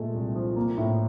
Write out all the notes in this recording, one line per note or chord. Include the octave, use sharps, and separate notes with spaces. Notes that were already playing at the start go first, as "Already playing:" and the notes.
Already playing: A#2 G#3 A3
C2
F3
A#3
A2